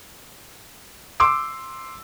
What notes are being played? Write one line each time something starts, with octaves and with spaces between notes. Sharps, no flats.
C6 D6 E6 D7